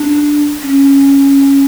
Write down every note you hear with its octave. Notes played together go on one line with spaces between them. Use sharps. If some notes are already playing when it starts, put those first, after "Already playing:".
Already playing: D4
C#4